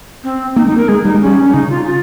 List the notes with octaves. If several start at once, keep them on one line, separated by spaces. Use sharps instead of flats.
C4
A#3 D#4
G#3 D#4
A#3
A#4
G#3 G#4
G3 D#4
G#3
G3 C#4
C#4
C#3 D#4
F4
F4